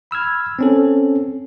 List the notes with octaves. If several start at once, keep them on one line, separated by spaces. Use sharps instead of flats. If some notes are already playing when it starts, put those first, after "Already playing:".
B5 E6 F6 G#6
C4 C#4 A4